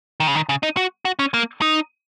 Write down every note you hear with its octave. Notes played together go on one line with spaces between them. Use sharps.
D#3
C#3
D#3
C#3
D#4
F#4
F#4
C#4
A#3
D#4